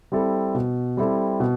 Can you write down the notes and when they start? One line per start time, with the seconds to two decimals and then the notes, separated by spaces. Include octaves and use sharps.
0.12 G3 C4 E4 A4
0.54 B2
0.97 G3 C4 E4 A4
1.40 B2